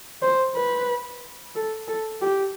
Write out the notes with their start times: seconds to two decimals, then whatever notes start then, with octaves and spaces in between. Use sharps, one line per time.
0.22 C5
0.56 B4
1.55 A4
1.88 A4
2.22 G4